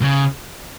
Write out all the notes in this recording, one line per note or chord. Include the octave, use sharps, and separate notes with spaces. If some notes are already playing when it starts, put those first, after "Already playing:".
C#3